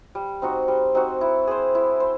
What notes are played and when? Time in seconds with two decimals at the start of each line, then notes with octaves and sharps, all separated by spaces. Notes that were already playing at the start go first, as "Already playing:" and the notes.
0.15 G3
0.42 C4 D#4 F#4
0.68 G3
0.95 C4 D#4 F#4
1.21 E4
1.47 G#4 C5
1.75 E4
2.00 C5